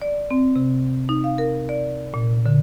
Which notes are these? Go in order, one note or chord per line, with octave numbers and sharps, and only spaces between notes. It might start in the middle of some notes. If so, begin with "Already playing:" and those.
D5
C4
C3
D#4
F5
A#4
D5
A#2
D3